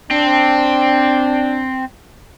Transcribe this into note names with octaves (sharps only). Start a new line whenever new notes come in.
C4 D4